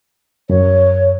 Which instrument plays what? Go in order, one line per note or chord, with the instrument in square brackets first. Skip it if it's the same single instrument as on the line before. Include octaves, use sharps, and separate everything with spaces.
[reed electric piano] F#2 [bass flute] C#5